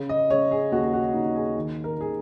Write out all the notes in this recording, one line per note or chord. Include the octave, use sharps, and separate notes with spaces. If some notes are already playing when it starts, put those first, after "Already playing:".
Already playing: C#3
D#5
C#3 C#5
G#4
D#2 F#4
F#4
D#2 D#4
G#4
D#3
A#4
D#3 G#4